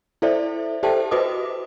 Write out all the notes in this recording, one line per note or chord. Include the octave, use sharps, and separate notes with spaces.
E4 A4 C5 D5 E5
G4 A4 C5 E5 G5 A5
F#4 B4 C5 D#5 D6 D#6